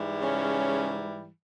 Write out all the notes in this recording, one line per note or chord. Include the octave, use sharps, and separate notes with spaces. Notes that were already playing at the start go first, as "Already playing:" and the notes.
Already playing: G#2 E3 G3
C#3 C#4